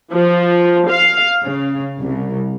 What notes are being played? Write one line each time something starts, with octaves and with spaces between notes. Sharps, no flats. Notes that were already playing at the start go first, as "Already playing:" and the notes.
F3
F5
C#3
C2